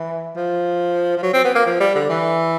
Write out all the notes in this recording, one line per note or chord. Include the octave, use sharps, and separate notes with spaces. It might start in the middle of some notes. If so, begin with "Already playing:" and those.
Already playing: E3
F3
F3
F#3
C4
B3
A#3
F3
G3
D3
E3